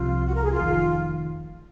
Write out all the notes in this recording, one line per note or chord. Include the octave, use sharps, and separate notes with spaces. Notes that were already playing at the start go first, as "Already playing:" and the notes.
Already playing: C2 C3 F3 F4
F#4
A#4
G#4
F4
F1 F2 D#3